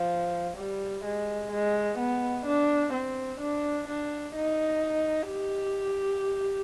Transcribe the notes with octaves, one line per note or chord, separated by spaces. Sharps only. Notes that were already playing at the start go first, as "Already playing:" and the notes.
Already playing: F3
G3
G#3
G#3
B3
D4
C4
D4
D4
D#4
G4